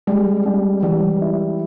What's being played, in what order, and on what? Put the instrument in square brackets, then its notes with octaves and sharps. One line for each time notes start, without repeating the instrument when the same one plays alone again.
[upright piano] G3 [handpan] G#3
[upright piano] G3
[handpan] E3 [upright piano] G3
[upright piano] E4